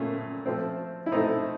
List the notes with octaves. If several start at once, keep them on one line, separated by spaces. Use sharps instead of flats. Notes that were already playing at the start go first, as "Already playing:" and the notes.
Already playing: A#2 F3 A3 C#4
F3 A3 C4
E4
F3 A3 C4 D#4